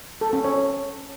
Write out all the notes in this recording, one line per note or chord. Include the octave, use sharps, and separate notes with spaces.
A4
C#4
C#5